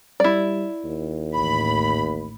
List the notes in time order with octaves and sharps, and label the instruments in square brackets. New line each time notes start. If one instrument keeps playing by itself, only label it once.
[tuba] G3 [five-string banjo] E4 D5
[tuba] D#2
[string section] A1 B5